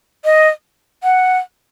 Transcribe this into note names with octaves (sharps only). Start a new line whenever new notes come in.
D#5
F#5